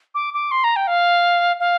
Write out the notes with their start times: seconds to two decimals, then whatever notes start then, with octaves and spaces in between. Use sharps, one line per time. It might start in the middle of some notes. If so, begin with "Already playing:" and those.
0.15 D6
0.34 D6
0.51 C6
0.64 A#5
0.76 G5
0.87 F5
1.60 F5